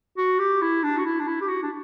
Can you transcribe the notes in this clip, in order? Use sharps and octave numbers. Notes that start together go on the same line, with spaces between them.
F#4
G4
E4
D4
F#4
E4
D4
E4
G4
F#4
D4